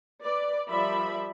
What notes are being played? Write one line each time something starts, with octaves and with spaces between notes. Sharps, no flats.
B4 D5
F3 G3 A#4 D5 E5 B5